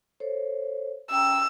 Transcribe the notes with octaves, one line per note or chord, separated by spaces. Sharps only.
A4 C5 C#5
C#4 G5 A#5 E6